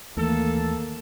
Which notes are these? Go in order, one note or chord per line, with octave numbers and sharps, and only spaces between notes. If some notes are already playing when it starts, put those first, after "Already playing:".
D#2 E3 A3 A#3 A4